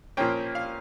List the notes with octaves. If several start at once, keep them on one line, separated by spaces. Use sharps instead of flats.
A#2 F3 A#3 C#4 G5
F5